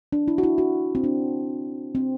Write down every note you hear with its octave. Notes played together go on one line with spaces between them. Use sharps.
D4
E4
F#4
E4
F#4
C4
D4
C4